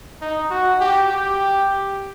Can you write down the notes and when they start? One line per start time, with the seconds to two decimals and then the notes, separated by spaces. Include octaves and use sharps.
0.21 D#4
0.51 F#4
0.80 G4
1.10 G4